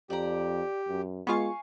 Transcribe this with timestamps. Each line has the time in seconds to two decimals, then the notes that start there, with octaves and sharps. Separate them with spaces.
0.10 F2 G4 D5 A#5
0.89 F#2
1.27 G#3 B3 F4 F5 G#5 C#6